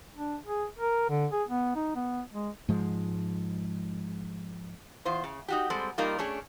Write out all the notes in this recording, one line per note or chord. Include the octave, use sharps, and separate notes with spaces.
D4
G#4
A#4
D3
G#4
B3
D#4
B3
G#3
G#2 F3 G#3
E2 F4 C5
C#3
D#4 F#4 G4
G3 G#3 C4 A4
G3 A#3 D#4 F4 A#4
A3 C#4 D4 G#4